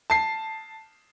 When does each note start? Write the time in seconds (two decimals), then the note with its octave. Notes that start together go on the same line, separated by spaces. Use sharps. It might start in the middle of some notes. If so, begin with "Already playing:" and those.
0.10 A5 C7